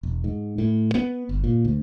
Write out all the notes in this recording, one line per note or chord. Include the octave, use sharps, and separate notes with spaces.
E1
G#2
A2
B3
G1
A#2
D2